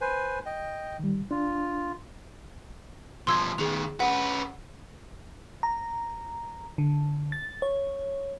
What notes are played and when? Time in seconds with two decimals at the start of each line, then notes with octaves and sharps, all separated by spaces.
0.01 B4 C5 G#5
0.46 D#5 G5
0.99 D#3 G3
1.31 D4 F4
3.27 B2 F3 C6 E6 G#6
3.58 D#3 B3 G#4 F7
4.00 C#4 B4 F#5
5.63 A#5
6.78 D3
7.32 A6
7.62 C#5